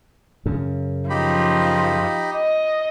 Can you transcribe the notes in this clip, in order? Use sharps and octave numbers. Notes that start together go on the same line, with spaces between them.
F#2 C#3
F3 D#4 G4 B5
D#5